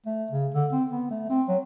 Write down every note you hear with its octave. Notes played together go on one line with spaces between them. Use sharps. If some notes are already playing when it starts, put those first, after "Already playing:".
A3
C#3
D3
C4
B3
A3
C4
F#3